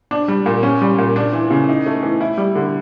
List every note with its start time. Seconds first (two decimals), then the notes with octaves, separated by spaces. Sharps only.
0.11 D4
0.28 G3
0.46 A#2
0.63 C#4
0.82 G3
0.98 A#2
1.16 D4
1.33 E3
1.51 C#3
1.69 D#4
1.86 A3
2.03 E3
2.21 E4
2.38 G3
2.55 D3